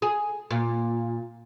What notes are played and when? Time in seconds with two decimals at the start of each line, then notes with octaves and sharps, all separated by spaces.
0.02 G#4
0.51 A#2